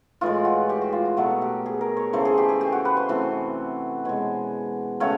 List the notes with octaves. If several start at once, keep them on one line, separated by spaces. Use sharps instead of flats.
A2 E3 G#3 F4
F#4
G4
F#4
F4
F4
B2 F#3 A3 F#4
G4
G#4
A#4
C#5
C#3 E3 A3 C5
G#4
G4
G#4
G4
F#4
B4
C5
C3 E3 A3
B2 G#3 C#5
C#3 F#3 A3 C#5